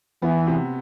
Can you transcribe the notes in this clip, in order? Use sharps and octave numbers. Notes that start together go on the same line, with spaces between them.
E3 B3
C3